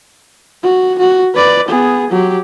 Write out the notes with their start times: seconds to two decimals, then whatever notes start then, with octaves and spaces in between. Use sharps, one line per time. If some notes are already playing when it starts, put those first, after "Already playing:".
0.64 F#4
0.99 F#4
1.35 B4 D5
1.68 B3 G#4
2.11 F#3 G4